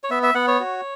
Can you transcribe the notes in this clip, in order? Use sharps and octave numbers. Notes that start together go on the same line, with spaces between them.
C#5
B3 E5
E5
B3 F#5
C#5
F#4